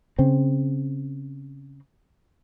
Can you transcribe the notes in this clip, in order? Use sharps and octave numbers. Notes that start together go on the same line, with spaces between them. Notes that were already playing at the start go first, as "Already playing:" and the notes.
C#3 C4